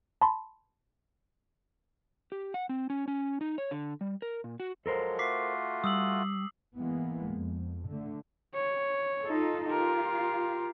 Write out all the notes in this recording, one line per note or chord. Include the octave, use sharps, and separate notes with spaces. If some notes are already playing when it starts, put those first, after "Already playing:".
A5 B5 C6
G4
F#5
C4
C#4
C#4
D#4
C#5
D3
G3
A#4
A#2
F#4
F3 F#3 G#3 A4 A#4 C5
A3 F4 F#4 D6 B6 C7
G3 D#6 E6 F#7
E3 G#3 A#3 B3
F2
D3 A3
C#5
D#4 F4 A4
F4 G4 A#4